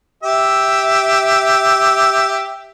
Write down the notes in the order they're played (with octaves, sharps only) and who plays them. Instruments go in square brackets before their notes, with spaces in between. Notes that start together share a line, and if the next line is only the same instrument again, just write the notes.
[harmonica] G4 E5